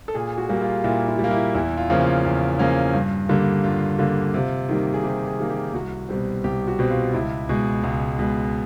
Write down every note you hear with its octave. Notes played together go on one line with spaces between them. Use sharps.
A4
A#2 G#4
F#4
G3 A#3
F4
A#2 E4
E4
G3
A#3
E4
E2 E4
F4
C#3 F3 A#3 C#4
F4
E2
C#3 F3 A#3 C#4
G2
D3 G3 A#3
G2 F4
D3 G3 A#3
C3 F4
D#3 G3 A#3
G#4
C3 G4
G#4
D#3 G3 A#3
G4
C2 F#4
B2 G3 C4
C2 G4
F#4
B2 G3 C4
F4
C#2 E4
B2 G#3
C#2
B2 G#3